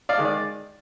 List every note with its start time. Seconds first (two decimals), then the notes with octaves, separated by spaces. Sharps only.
0.09 D5 F5
0.17 D#3 G#3
0.25 D5